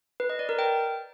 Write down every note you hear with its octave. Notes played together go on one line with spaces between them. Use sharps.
B4
D#5
D5
A#4
G5